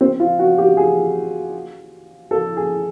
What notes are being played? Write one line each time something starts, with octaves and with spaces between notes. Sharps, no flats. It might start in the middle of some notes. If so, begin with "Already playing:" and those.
C4
F4
F#4
G4
G#4
A4
G#4